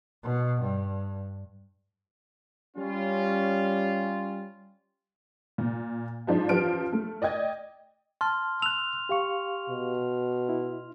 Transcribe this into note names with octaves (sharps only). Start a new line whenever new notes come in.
B2
G2
G3 C#4 F4
A#2
G#2 F3 D4
F#2 E3 F3 G4 F6 D7
A3
D5 D#5 G5 G#6
A5 C6 F6
E6 F#6 F7
G4 F5 C#6
B2
E4